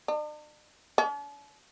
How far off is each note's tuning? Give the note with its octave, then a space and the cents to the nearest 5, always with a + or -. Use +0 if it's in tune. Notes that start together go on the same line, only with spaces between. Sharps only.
D4 +45
D4 -45